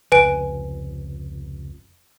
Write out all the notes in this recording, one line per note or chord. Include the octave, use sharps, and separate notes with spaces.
F1 C#2 B4 G#5 D7